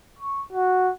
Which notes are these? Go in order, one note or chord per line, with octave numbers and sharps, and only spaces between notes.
C#6
F#4